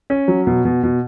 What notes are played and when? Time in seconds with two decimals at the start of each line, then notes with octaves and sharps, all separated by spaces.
0.10 C#4
0.28 F#3
0.47 B2
0.65 B2
0.83 B2